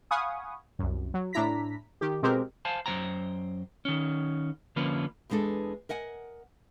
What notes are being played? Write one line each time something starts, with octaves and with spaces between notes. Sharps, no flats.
F5 F#5 G#5 B5 C#6 D#6
C2 F#2
F#3
A2 D4 E4 A#5 B6
D#3 G4
B2 G#3 C4 G4 A#4
C5 F5 G#5 A5
F#2 G#3 C5 G5 A#5
D#3 C#4
D3 F3 A#3 C#4 B4
E2 E3 G#3 D4 A4
A#4 D#5 F#5 G#5